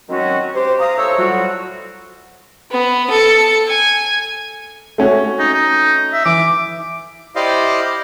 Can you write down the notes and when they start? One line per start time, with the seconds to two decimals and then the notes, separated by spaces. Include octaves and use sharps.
0.09 D#3 F#3 G#3 C4 C#4 F#4
0.55 G4 C5
0.79 F5 A#5 D#6
0.97 A2 C5 C#5 E5 C#6 E6
1.17 A2 F#3 G3 F4 F#4
2.71 B3
3.10 A4 C#7
3.68 G#5
4.98 A3 C#4 F#4
5.39 D#4
5.53 D#4
6.13 E5
6.26 E3 D6
7.36 E4 G4 C5 D5 D#5 F5